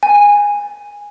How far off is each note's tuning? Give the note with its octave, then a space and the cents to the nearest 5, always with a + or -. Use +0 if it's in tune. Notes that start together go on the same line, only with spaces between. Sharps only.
G#5 -15